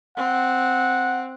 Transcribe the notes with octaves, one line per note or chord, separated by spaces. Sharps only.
C4 F#5